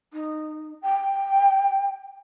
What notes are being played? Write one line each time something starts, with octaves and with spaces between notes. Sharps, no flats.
D#4
G5